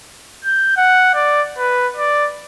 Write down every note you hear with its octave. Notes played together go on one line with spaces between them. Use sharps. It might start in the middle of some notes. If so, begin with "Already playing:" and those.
G6
F#5
D5
B4
D5